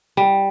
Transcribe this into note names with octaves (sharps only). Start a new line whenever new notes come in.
G3